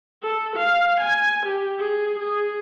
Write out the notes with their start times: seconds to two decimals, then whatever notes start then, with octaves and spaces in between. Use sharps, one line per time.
0.23 A4
0.56 F5
1.00 G#5
1.46 G4
1.79 G#4
2.19 G#4